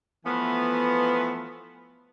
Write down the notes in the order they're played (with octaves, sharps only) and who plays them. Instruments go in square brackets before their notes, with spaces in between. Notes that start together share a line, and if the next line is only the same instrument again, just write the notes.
[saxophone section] E3 F3 A3 B3